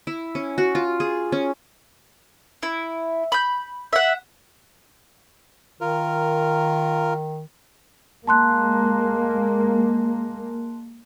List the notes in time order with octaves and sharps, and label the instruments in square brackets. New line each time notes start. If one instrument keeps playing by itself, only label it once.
[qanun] E4
C#4
F#4
F4
G#4
C#4
[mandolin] E4
B5 G6
E5 F#5
[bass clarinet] D#3 [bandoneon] F4 A#4
[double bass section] G#3 A#3 [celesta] A5 C6 F#6